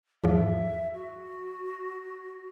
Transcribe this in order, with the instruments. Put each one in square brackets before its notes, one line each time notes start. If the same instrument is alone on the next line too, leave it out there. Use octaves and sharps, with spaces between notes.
[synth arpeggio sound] E2 G#2 F3 [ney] E5
[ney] F#4